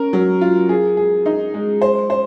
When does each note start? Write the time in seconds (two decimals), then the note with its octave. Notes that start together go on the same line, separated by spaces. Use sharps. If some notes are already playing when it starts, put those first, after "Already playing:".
Already playing: C#4 A#4
0.13 F#3
0.41 F4
0.69 G#4
0.97 G#4
1.26 D#4
1.54 G#3
1.82 C5
2.10 C5